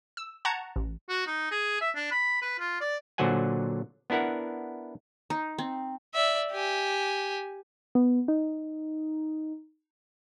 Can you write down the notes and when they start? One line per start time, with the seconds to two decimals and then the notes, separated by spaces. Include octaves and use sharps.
0.17 E6
0.45 F#5 A5 A#5 C#6 G#6
0.76 A1
1.09 F#4
1.27 D#4
1.51 G#4
1.81 E5
1.95 D4
2.11 B5
2.42 B4
2.59 F4
2.81 D5
3.18 A#2 D3 F#3 C5 F#5 G#5
4.10 B3 D4 E4 A#4 F#5
5.30 D#4
5.59 C4
6.14 D5 E5
6.51 G4 G#5
7.95 B3
8.28 D#4